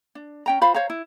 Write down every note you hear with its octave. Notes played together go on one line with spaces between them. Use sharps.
D4
C#4 G5 A#5
F4 C5 F5 B5
C5 C#5 F5 A#5
E4